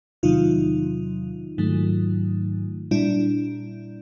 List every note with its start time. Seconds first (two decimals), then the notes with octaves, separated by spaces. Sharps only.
0.23 E2 C3 D#3 F#3 D#4 F4
1.58 G#2 D#3 F#3 A3
2.91 A#2 G3 D4 E4